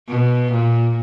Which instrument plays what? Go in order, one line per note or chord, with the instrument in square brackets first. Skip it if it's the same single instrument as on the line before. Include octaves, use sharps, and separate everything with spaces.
[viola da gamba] B2
A#2